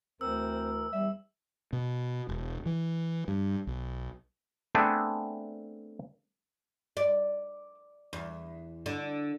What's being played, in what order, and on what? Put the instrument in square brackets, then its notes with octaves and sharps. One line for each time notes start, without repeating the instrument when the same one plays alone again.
[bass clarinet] D2 [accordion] E3 A#4 [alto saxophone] C4 [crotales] E6
[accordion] E2 [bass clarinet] G3 [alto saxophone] E5
[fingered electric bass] B2
E1
E3
G2
B1
[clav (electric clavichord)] A3 B3 C4 D4 G#4
[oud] D5
E2
D3